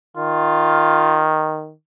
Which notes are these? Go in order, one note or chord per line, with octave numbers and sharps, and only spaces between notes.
D#3 F4